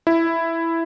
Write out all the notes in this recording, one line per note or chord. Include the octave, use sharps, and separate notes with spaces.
E4